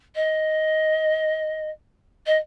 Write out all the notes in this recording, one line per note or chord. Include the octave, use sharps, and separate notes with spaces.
D#5
D#5